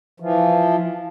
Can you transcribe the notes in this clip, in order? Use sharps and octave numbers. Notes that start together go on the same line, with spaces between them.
E3 F3